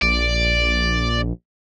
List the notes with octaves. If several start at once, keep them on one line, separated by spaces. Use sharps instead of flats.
A#1 D5